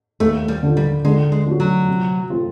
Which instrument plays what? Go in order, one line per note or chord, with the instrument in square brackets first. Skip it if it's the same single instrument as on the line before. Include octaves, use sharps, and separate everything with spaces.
[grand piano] D#2 [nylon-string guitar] A3
[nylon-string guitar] G3
[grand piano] D3 F3
[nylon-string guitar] G3
[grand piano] D3 [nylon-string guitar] G#3
[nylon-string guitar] G#3
[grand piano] F3 A3 C#4 F#4
[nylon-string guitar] F#3
[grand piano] C3
F3 A3 C4 F4